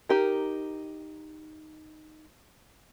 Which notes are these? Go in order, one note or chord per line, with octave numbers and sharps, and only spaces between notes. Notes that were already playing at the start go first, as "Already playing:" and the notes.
D#4 G4 A#4